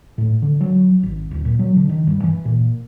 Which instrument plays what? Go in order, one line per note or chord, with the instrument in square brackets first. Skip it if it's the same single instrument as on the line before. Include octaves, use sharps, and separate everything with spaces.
[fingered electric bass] A2
D3
F#3
G#1
D1
A#2
F#3
D3
D#3
G2
E3
A#2